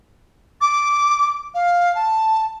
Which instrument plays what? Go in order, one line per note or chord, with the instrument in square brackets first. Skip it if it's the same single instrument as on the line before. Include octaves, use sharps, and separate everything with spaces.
[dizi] D6
F5
A5